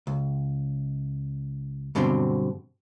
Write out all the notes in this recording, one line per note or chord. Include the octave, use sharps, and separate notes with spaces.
C#2
G2 B2 D3 F#3 C4